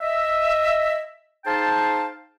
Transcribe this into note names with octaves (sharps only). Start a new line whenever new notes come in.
D#5 E5
D#4 G#4 C5 F5 G5 A5